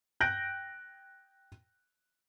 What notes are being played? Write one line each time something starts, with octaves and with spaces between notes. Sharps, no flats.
G5 F#6 G6 A#6 D7